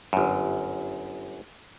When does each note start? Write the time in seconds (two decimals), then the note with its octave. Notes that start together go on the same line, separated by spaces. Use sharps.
0.13 G1 F#2